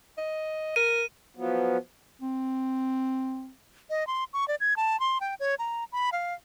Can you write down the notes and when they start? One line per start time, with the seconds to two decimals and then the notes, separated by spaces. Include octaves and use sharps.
0.18 D#5
0.76 A#4 D#7
1.37 F3 F#3 B3
2.21 C4
3.90 D#5
4.07 C6
4.33 C#6
4.48 D5
4.60 G#6
4.77 A5
5.00 C6
5.21 G5
5.40 C#5
5.59 A#5
5.92 B5
6.12 F5